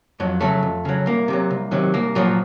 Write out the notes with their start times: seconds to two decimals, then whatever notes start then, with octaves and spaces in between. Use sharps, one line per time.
0.20 F2 F#3
0.41 C#3 F#3 A3
0.63 F2
0.85 C#3 F#3
1.06 C2 A#3
1.28 C3 D#3
1.33 F#3
1.51 C2
1.71 C3 D#3 F#3
1.94 C2 A#3
2.15 A#2 F3 F#3